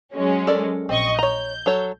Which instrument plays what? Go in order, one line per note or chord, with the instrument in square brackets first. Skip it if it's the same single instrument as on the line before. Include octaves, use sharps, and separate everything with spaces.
[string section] F#3 G#3 C#4
[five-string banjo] A4 A#4 D5
[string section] A#1 D#5 C#6 [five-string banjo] C4
[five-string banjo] C#5 A#5 [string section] G6
[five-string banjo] F#3 A4 C#5